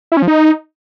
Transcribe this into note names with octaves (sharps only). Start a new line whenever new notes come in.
E4
C#4
F3
D#4